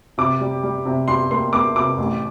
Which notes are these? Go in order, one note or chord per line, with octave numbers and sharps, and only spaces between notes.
C3 D6
G3
G3
C3
G3 C6
A#3 C6
A#3 D6
C3 D6
A1